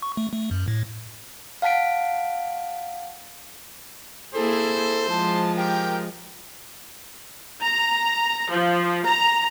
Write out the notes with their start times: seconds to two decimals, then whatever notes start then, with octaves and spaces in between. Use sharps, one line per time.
0.02 C#6
0.17 A3
0.33 A3
0.51 F#2
0.68 A2
1.62 F5 F#5 A5 B6 D7
4.34 A#3 C4 E4 G#4 A4 C5
5.09 F3 G#3 A5
5.57 G4 A#4 G5
7.62 A#5
8.50 F3
9.05 A#5